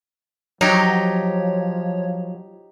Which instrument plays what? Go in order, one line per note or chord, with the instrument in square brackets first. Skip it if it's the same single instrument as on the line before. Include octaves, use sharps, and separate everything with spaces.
[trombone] F3 [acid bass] F#3 [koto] D#4 G4 [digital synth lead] C#5